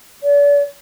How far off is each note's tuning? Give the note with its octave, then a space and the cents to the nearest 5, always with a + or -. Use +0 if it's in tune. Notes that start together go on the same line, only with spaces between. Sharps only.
D5 -40